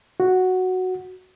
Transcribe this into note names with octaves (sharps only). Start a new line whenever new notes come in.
F#4